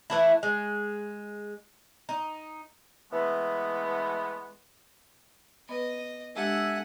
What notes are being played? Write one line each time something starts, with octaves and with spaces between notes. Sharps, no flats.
E3 A3 E4
G#3
D#4
E3 G#3 A3 B3
B3 B4 D#5
G#3 D4 G4 A4 E5 F#5 G#5